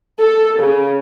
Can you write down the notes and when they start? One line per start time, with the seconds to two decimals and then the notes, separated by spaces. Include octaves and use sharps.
0.21 A4
0.61 C#3